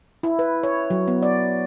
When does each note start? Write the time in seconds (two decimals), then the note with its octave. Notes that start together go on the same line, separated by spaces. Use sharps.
0.23 E4
0.39 B4
0.63 C#5
0.90 F#3
1.08 B3
1.22 D5